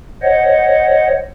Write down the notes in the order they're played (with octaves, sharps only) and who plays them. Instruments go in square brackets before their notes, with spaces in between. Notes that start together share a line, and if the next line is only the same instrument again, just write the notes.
[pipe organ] C5 C#5 D#5 F#5